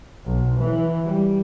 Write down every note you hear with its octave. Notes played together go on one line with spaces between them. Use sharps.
B1
E3
G3